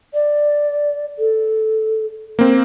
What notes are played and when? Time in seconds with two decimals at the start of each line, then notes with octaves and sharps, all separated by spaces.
0.14 D5
1.19 A4
2.39 A#3 C4